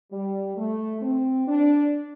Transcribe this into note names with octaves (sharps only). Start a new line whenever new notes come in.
G3
A3
C4
D4